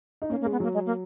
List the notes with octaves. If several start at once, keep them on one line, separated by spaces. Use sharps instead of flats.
D#4
A#3 C#4
A#3
G#3
B3
F#3 A#3
G#3
A#3